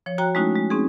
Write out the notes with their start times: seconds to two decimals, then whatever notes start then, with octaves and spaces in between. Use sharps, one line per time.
0.06 F3 C#5
0.18 F#4 C#5 G5 A#5 F#6
0.35 G#3 A3 C#4 D#4 E4 F#4
0.56 G#3
0.70 C4 C#4 D#4 G#4